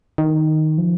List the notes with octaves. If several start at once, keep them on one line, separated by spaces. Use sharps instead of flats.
D#3
F3